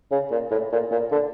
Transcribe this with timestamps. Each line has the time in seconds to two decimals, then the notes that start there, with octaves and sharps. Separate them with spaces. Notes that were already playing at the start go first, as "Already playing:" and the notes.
0.12 C#3
0.31 A#2
0.51 A2
0.72 A#2
0.91 A#2
1.12 D3